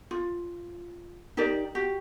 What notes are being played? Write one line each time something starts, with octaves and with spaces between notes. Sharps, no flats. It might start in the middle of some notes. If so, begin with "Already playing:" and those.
F4
D#4 G4 A#4 D5
F#4 G4